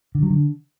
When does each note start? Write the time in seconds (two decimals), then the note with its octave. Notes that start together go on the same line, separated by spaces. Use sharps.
0.15 D3
0.22 F#3
0.30 D3